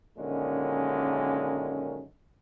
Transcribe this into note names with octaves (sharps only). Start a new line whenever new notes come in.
F#2 A#2 D3 D#3 G#3 C#4